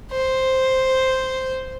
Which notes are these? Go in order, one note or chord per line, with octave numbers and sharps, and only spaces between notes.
C5